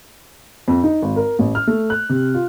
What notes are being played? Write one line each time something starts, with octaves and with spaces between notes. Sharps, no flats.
F2
D#4
G#1
A#4
A1
F6
A3
F#6
C3
F4